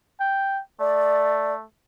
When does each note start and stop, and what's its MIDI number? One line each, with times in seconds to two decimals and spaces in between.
0.20 0.61 79
0.80 1.64 57
0.80 1.54 74